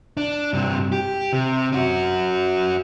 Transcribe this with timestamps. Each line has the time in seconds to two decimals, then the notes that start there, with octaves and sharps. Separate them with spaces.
0.17 D4
0.53 G2 C3
0.92 G4
1.33 C3
1.72 C#4 F#4